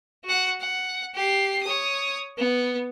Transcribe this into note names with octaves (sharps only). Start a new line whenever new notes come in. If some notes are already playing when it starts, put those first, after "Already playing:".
F#4 F#5
F#5
G4 C7
C#5 D#6
B3